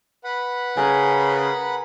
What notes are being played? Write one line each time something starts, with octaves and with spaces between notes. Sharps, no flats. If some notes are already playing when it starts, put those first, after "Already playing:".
B4 F#5 B5
C#3 A#4 G#5